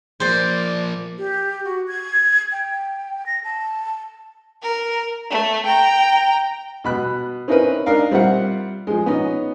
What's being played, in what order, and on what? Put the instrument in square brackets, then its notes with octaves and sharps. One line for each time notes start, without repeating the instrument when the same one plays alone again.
[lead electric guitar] F3 A#3 [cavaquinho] C5 D5
[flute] G4
F#4
G#6
G5
A#6
A5
[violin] A#4
A3
G5 A#5
[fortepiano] B2 B5 F#6
C4 C#4 D#4 E4 A#4 B4
D4 D#4 A#4 F5
G3 C4 F4 E5 F#5
F3 G#3
B3 C#4 D#4